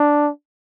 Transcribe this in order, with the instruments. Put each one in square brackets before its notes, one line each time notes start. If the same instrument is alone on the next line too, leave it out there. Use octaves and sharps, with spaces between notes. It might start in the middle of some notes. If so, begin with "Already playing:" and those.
Already playing: [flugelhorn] D4